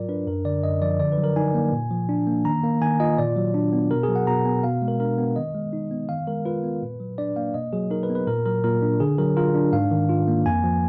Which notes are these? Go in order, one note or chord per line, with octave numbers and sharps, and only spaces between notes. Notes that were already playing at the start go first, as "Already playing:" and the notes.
Already playing: G#2 F#3 F4 A#4 D5
D4 B4
F#2 A#4
D3 D5
F#2 D#5
F3 D5
D3 D5
B4
F#3
A#4
D#4 G#5
A#3
A#2
F3
D4
A#3
D#3 A#5
A#3
D#3 G#5
F4 D#5
A#2 D5
F#3
D4
B3
B2 A#4
G#4
F#3
F#5
B2 A#5
B3 G#5
B2 F5
G#3
A#4
D4 A#4
B3
D#3 D#5
G#3
D#4
B3
D#3 F5
G#3 A#4
F4 B4
B3
A#2
F#3
D4 D5
A#3 F5
B2 D#5
F#3 G#4
D#4 A#4
B4
B3
B4
A#2 A#4
F#3 A#4
A#2 A#4
D4
D3 G#4
F#3 A#4
F4 A#4
D4
G#2 F5
D#3
F4
A#3
F2 G#5
F3